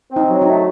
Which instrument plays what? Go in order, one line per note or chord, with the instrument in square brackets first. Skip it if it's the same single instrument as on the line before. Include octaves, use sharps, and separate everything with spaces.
[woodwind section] C4
[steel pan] D#4
[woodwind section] F#3
[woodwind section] A3 [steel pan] D#4